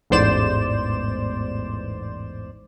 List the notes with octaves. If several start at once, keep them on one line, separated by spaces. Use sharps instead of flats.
A1 E2 G#2 C5 D5 E7